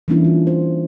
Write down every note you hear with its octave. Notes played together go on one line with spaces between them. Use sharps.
E3 G3 A#3 C#4 D4 E4
F4
C5